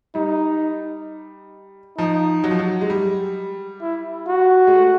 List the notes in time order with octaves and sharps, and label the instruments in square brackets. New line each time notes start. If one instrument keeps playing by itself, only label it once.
[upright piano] G3 [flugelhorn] D#4
[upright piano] F3 [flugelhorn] D#4
[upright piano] F#3
F3
F#3
G#3
G3
[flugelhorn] E4
F#4
[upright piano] G#3
A3